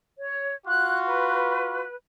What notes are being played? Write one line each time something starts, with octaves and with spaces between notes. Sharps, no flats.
C#5
F4 F#4 F#6
B4